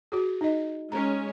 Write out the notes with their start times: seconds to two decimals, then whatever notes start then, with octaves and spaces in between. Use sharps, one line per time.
0.12 F#4 G#4
0.41 D#4 D#5
0.92 G#3 C#4 A#5